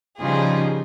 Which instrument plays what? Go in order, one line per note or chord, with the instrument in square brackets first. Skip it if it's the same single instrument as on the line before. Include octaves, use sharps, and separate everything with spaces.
[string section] C#3 F3 G3 D#4 F4 G#4